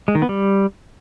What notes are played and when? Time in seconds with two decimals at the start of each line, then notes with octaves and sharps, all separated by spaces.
0.08 G#3
0.15 D#3
0.22 B3
0.29 G3